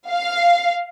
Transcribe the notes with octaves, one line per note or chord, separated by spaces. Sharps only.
F5